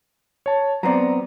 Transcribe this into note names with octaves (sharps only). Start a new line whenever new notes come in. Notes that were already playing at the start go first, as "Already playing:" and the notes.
C#5 A5
F#3 B3 C4 D5 A#5